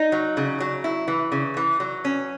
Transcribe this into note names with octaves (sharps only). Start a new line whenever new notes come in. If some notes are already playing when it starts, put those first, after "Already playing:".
Already playing: D#4
F#3
C#3
F#3
E4
E3
C#3
E3
F#3
C#4